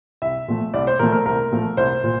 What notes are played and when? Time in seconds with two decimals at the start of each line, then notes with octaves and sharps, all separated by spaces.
0.22 C2 E5
0.48 A#2 F3 A3
0.74 C2 D5
0.87 C5
0.99 A#2 F3 A3 A#4
1.12 A#4
1.26 C2 A#4
1.52 A#2 F3 A3
1.77 C2 C5
2.04 A#2